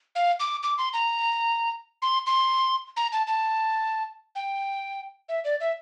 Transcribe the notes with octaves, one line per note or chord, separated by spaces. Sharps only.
F5
D6
D6
C6
A#5
C6
C6
A#5
A5
A5
G5
E5
D5
E5